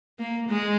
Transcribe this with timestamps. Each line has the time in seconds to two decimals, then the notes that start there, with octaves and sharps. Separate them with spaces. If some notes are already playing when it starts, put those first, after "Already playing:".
0.19 A#3
0.48 G#3